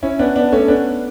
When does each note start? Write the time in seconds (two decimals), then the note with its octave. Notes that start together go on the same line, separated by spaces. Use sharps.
0.03 C#4 E4
0.19 B3 D4
0.36 B3 D4
0.52 A3 C#4
0.68 B3 D4